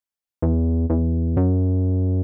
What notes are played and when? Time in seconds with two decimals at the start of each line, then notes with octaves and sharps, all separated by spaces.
0.42 E2
0.90 E2
1.37 F#2